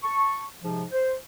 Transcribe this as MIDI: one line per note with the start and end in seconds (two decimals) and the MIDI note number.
0.04 0.43 81
0.04 0.43 85
0.63 0.84 44
0.63 0.84 48
0.63 0.84 53
0.92 1.14 72